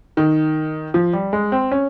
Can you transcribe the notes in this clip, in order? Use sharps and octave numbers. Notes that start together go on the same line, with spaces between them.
D#3
F3
G3
G#3
C4
C#4